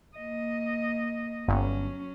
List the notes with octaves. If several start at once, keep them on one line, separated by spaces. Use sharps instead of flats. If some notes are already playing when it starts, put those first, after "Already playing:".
A#3 D#5
G1 F#3 C#4